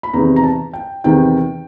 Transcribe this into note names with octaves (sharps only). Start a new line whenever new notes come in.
B5
E2 C3 D#3 A#5
A#5
A5
G5
E2 C3 D#3 G5